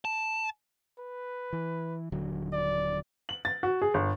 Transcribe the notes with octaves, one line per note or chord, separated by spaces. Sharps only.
A5
B4
E3
D#1 D3 F#3
D5
F#7
A6
F#4
G#4
G1